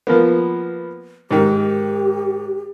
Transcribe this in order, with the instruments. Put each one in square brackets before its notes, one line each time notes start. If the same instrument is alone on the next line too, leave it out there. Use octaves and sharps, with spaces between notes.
[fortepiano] F3 A#3 B3
[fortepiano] G#2 D#3 [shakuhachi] G4